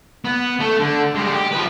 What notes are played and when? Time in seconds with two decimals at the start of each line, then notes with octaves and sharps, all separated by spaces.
0.25 B3
0.60 A3
0.80 D3
1.15 G3 G#3
1.35 G4
1.52 F3 B4